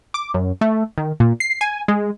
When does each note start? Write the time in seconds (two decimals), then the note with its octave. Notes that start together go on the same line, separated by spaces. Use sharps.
0.14 D6
0.34 F#2
0.61 A3
0.98 D#3
1.20 A#2
1.40 C7
1.61 G#5
1.88 G#3